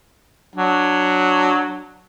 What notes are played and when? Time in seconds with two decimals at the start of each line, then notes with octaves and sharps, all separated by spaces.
0.56 F#3 D4